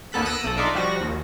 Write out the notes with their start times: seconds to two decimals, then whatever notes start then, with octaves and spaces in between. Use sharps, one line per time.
0.12 D#2 A#3 B3 A4 F#6 B6
0.25 D#6 E6 F#6 A#6 D7 D#7
0.44 B1 A4
0.57 D4 D#4 F4 D5 E5
0.74 F3 G3 F#4 A#6
1.00 D#2